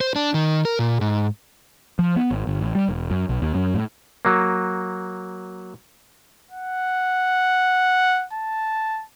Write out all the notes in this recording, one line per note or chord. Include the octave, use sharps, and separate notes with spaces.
C5
D4
D#3
A#4
A#2
G#2
F3
B3
G#1
G1
A1
G3
E1
F#2
B1
D#2
F#2
A2
F#3 A#3
F#5
A5